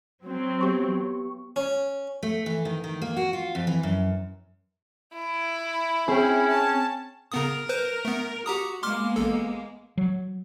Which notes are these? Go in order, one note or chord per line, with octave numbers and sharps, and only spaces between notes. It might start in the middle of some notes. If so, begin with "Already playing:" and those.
F#3 C4
B3 G4 C#6
C#4
A3
E3
D#3
D#3
A#3
F#4
F4
F2
E3
F#2
E4
C4 C#4 G#4 G5
A5
C#3 B3 A#4 D#6
B4 C5
A3 B3
F#4 G4 A#5 D#6
G#3 A#3 B3 C6 D6 F6
A1 A4
F#3